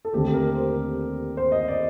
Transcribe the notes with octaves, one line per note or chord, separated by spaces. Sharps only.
A4
D#2 D3 A3 C4 G4
A#4
C5
C5
D#5
D5